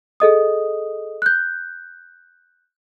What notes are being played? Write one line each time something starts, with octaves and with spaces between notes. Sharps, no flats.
G#4 A4 D#5 D#6
F#6 G6